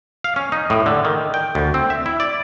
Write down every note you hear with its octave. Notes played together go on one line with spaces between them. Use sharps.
F5
C#4
D#4
A2
D3
D#3
G5
D2
C4
E5
E4
D5